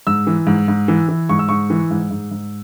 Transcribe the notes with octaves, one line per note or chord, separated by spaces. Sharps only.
G#2 E6
E3
G#2
G#2
E3
E3
G#2 C#6
E6
G#2 C#6
E3
G#2
G#2
G#2